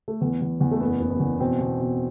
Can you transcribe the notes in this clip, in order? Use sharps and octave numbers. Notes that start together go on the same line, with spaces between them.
A3
E2 B3
E2
E2
A3
F#1 B3
F#1
B3
E2
B2 C4
B2
B2